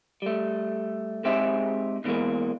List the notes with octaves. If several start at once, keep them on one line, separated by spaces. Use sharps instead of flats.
G3 A3
G#3 C4 D#4 G4 G#4 E5
B2 D3 E3 G#3 A#3